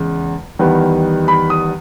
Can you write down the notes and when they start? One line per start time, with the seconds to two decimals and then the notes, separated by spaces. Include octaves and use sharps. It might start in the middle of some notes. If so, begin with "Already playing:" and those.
Already playing: E2 C#3 G#3
0.59 E2 D#3 G3 B3
1.28 B5
1.50 D#6